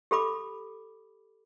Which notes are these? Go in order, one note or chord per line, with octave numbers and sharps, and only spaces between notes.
G4 A4 B5 D6